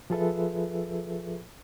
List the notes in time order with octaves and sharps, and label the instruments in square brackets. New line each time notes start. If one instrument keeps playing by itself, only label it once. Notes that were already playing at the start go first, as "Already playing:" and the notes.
[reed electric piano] F3 F4 G#4 A4 B4 E5